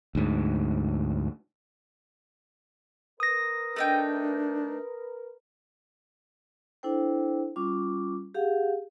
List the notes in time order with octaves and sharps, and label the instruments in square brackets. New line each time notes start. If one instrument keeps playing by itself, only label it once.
[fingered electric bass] D2 G#2
[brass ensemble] A#4 B4 [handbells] D#6 A#6
[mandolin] A3 D#4 G5 [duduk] D4
[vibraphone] D4 E4 A4 C5 G5
G3 C#4 F4 D6
G4 G#4 F5 F#5